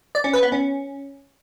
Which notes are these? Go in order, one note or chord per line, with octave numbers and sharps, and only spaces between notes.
D5
C#4
B4
B3
C#4